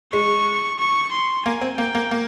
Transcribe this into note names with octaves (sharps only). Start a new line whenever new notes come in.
G#3 C#6
C#6
C6
A#3 G#5
C4
A#3 G5
A#3
A#3